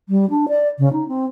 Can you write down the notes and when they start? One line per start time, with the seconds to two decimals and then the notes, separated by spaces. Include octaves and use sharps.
0.09 G3
0.30 D4
0.48 D5
0.78 C#3
0.92 D#4
1.08 C4